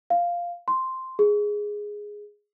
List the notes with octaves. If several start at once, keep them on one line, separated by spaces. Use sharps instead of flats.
F5
C6
G#4